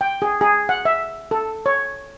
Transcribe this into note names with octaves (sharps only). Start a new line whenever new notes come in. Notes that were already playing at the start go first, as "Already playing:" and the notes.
G5
G#4
G#4
F#5
E5
A4
C#5